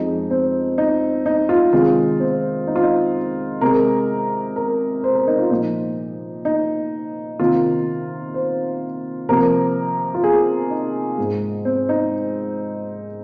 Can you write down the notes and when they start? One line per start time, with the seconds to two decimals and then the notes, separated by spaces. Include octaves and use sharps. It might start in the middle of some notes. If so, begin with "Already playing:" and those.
Already playing: F2 F3 G#3 D#4
0.31 C4
0.78 D#4
1.26 D#4
1.49 F4
1.73 C3 D#3 G#3 F4
2.20 C4
2.67 D#4
2.76 F4
2.83 D#4
3.61 C3 G#3 A#4
4.56 A#4
5.04 C5
5.15 A#4
5.27 D#4
5.39 F4
5.51 A#2 F3 A#3 D#4
6.45 D#4
7.40 C3 D#3 A#3 F4
8.34 C5
9.29 C3 F3 A#3 A#4
10.15 F4
10.24 G#4
10.70 D#4
11.18 G#2 G#3
11.65 C4
11.89 D#4